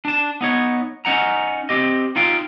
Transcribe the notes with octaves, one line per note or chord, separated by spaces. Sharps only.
D4 A5
B3 D#4 C#5
C#4 D#4 F#5 A#5
C4 G4 D#5
D#4 F4 F5 G5